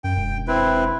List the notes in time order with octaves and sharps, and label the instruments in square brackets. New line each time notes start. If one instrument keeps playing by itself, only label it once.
[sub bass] F#2 [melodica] G5
[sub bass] E1
[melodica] C4 E4 B4